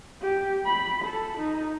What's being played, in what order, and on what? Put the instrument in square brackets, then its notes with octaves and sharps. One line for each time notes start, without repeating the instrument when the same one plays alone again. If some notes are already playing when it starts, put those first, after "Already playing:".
[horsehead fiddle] G4
B5
A4
D#4